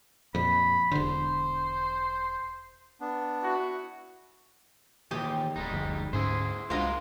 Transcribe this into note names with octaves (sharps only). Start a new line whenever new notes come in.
F2 A#2 B5
E1 D3 C5
B3 D4
E4 F#4
D#2 A#2 E3 G4 G#4
D1 G3 G#3 D#4
F#1 D2 F3
D2 G#2 C#4 E4 G#4 C5
C2 G#3 D4 F4 F#4 A#4 C5